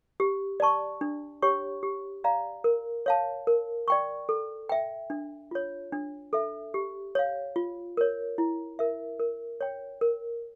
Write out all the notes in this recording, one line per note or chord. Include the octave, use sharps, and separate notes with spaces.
G4
D5 A5 C#6
D4
G4 C#5 G5 C#6
G4
D5 F5 A#5
A#4
C#5 F5 A5
A#4
D5 G5 C#6
A4
E5 G5
D4
F4 C#5
D4
A4 E5
G4
C#5 F5
F4
A#4 C#5
E4
A#4 E5
A#4
C#5 G5
A#4